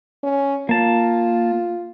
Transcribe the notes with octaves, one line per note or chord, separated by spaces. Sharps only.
C#4
A#3 F4 A5